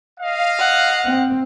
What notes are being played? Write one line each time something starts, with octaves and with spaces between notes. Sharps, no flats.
D#5 F5
F#5
C4